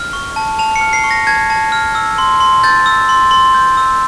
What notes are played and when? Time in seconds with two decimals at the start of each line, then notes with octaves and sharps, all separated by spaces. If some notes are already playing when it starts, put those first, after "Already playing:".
Already playing: F6
0.13 C#6
0.36 A5
0.59 A5 F7
0.76 C#7
0.81 F6
0.93 C7
1.04 C#6
1.11 A#6
1.27 A5 G#6
1.50 A5
1.72 F6
1.95 E6
2.18 C6
2.40 C6
2.63 G6 A6
2.86 E6
3.09 C6
3.31 C6
3.54 G6
3.77 E6